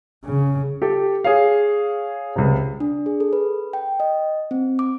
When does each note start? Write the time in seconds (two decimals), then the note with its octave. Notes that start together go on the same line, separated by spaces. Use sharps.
0.24 C#3
0.82 G4 A4
1.24 G#4 C#5 F5
2.36 C#2 C3
2.80 D4
3.06 G#4
3.20 A4
3.33 B4
3.73 G5
4.00 D#5
4.51 C4
4.79 D6